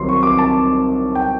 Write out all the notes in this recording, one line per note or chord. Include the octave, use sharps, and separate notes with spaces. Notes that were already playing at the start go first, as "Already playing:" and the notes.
Already playing: C2 D#3 F#3 C6
C#6
D6
A5
G5